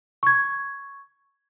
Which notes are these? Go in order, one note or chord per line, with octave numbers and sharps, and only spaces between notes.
C#6 G#6